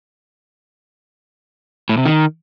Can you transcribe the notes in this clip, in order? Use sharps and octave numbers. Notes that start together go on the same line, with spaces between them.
A2
C3
D#3